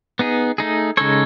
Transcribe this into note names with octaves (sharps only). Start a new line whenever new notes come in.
B3 D#4 G#4
A3 D#4 G#4
C#3 G#3 D#4 A4 C#5